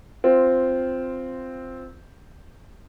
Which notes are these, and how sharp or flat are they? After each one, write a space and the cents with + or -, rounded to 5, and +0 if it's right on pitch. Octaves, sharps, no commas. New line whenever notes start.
C4 -5 F4 +0